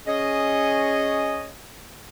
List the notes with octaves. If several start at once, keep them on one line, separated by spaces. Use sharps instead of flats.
C#4 G#4 C#5 D#5